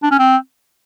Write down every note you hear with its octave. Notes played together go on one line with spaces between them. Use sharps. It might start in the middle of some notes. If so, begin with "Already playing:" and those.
D4
C#4
C4